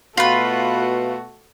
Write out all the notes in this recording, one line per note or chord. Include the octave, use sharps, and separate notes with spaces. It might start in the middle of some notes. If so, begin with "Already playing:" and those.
B2 A3 F4 F#4 B4